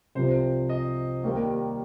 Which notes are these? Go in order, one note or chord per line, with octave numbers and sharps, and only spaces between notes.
C2 C3 F3 C5
D#5
D#2 D#3 G3 A#3